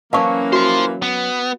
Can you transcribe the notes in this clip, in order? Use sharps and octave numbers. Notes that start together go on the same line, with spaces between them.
E3 F#3 A#3 C#4 F5 A5 C#6
F4 F#4 C5
B3